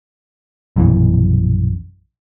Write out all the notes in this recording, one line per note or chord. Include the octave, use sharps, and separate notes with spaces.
A#1 F#2 B2 E3